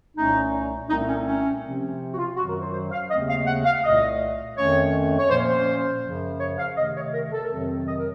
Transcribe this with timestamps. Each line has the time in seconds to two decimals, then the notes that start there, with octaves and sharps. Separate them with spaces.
0.17 C2 A#2 A3 C#4 D#4
0.90 C2 A#2 A3 C4 D#4
1.09 C#4
1.27 C#4
1.64 C3 F3 C4
2.12 F#4
2.18 F4
2.37 F#2 D#3 F#3 F#4
2.49 A#4
2.62 C5
2.73 C5
2.92 F5
3.10 D#2 C#3 A3 C4 D#5
3.29 F5
3.46 F#5
3.65 F5
3.84 C2 A#2 A3 D#5
4.57 F2 D#3 A3 C#4 C#5
5.19 C#5
5.30 A#2 F3 A#3 C#4 C5
5.48 C5
6.04 F#2 C#3 F3
6.40 C#5
6.58 F5
6.77 C3 D#3 A3 D#5
6.95 C#5
7.13 A#4
7.32 A4
7.44 A#4
7.50 F2 C3 D#3 F#3 C4 A4
7.87 D#5
7.97 A#4